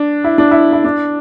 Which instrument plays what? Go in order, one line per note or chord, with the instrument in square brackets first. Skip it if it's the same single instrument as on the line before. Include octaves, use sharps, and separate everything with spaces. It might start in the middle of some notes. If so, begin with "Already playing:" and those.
Already playing: [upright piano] D4
E4
D4
E4
E4
D4